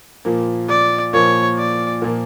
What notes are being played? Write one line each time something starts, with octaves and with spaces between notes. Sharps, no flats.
A#2 F3 A#3
D5
A#2 F3 A#3 C#5
D5
A#2 F3 A#3